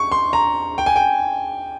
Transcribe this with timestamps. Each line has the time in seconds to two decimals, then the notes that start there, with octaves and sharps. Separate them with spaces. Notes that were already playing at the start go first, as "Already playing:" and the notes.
Already playing: C#6
0.12 C6
0.33 A#5
0.78 G5
0.86 G#5
0.96 G5